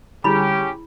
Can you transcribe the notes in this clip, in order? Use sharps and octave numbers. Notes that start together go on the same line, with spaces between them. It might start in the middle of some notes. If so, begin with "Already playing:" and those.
D3 G3 C#4 E4 G4 G#4 B5